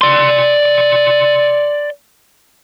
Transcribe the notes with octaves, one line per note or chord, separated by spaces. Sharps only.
D5 C6